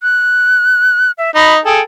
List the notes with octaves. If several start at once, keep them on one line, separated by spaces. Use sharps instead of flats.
F#6
E5
D#4 D#5 B5
G#4 A4 G5